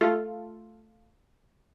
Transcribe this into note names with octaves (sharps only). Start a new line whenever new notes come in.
A3 F4 A4